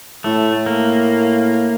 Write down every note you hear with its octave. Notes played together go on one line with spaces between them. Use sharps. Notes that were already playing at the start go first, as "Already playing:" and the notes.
A2 A3
A#3